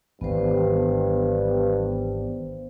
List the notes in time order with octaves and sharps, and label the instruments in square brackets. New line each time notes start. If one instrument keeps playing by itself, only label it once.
[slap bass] G#1 E3 [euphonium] G2 [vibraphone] B3 C5